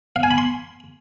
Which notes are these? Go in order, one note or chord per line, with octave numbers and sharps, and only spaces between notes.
F5
G#5
B5
C6